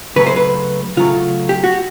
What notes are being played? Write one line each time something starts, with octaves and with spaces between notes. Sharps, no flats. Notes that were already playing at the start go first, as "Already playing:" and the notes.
C#3 F#3 A3 B4
C5
B4
C#3 F#3 A3 F4
G4
F#4